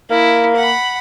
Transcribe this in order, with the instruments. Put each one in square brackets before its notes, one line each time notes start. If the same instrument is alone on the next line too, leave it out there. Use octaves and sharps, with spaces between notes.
[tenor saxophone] A#3 [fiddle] E4
[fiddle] F#5 B5